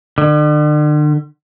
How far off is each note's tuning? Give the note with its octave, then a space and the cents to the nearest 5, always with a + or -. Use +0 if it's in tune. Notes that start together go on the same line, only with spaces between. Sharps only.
D3 +40